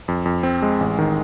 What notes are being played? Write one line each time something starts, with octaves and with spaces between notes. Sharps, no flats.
F2
F2
C4
G#3
A1
D#3